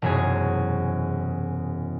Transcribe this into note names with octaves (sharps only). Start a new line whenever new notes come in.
E1 F#2 C3 F#4 G#4